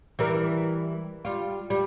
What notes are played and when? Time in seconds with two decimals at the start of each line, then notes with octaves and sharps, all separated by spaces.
0.19 E3 G3 A#4
1.25 G3 F4
1.70 G3